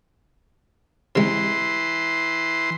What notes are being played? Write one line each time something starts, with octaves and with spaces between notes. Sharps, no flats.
C3 E3 G#3 C6